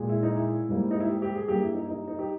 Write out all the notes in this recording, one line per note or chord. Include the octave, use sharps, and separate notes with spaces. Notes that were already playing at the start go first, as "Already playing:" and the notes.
Already playing: A#2 G#3
E4
D#4
E4
G#2 G3 A#3
D#4
E4
G4
G4
G#4
G2 G3 A#3 G4
E4
D#4
D#4
D#4
G4